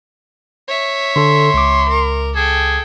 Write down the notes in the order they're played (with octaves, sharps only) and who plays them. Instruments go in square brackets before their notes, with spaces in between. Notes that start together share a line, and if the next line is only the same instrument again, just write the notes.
[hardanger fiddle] C#5 E5
[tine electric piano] D3 A4 [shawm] C6
[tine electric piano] C#2 D6
[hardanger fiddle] A#4
[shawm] G#4 [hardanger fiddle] A4 G5